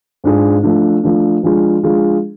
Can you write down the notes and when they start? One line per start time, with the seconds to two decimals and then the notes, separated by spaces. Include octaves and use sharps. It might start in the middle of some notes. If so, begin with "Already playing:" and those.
0.24 G#2 G#3 D4 F4 G#4
0.63 F3 A3 D4
1.03 F3 A3 D4
1.43 F3 G#3 D4 F4 G#4
1.83 F3 G#3 D4 F4 G#4